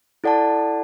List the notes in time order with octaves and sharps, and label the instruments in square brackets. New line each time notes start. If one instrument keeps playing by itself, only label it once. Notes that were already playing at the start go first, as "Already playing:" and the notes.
[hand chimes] E4 A4 D5 F#5 A5